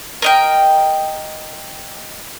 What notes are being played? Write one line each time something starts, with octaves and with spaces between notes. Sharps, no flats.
A#4 D#5 G5